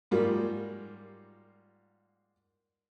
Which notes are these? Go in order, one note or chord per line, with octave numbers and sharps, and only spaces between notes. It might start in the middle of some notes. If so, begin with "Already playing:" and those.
G#2 F#3 G3 A#3 F4